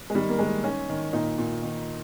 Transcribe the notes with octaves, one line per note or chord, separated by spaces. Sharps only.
G#3
D#3 G3
A#3
D#3 G#3
D#3 C#4
D#3
A#2 D#4
A#2
D#3